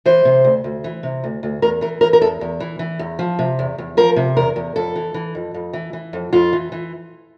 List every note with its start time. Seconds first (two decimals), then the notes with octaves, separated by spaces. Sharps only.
0.05 E3 C5
0.25 C3
0.44 D2
0.64 D2
0.84 E3
1.03 C3
1.24 D2
1.43 D2
1.62 E2 A#4
1.81 E3 A#4
2.01 E3 A#4
2.13 A#4
2.21 E2 A4
2.41 E2
2.60 E3
2.79 E3
2.99 E2
3.19 F3
3.39 C3
3.59 E2
3.78 E2
3.97 F3 A#4
4.16 C3
4.37 E2 A#4
4.56 E2
4.76 F2 A4
4.96 E3
5.14 E3
5.35 F2
5.54 F2
5.73 E3
5.93 E3
6.13 F2
6.33 F2 F4
6.53 E3
6.72 E3